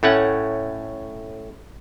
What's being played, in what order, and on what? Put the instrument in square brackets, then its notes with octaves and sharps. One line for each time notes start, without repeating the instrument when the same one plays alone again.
[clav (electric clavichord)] A2 A3 C#4 F#5